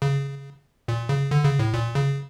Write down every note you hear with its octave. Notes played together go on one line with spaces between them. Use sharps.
C#3
A#2
C#3
D3
C#3
A2
A#2
C#3